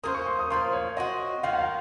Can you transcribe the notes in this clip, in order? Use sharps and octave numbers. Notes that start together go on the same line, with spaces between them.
A#3 C#4 G#4 C5 D#6
C#6
C6
D#6
A#2 F3 A#3 C6
C5
C#5
C4 D#4 F#4 D#5
D#3 A#3 F4 F5
F#5
F5